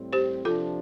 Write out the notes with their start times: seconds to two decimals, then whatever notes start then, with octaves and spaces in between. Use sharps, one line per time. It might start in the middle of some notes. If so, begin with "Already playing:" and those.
Already playing: A2 G3 C4
0.13 G4 C5
0.45 C3 F3 D4 F4 A4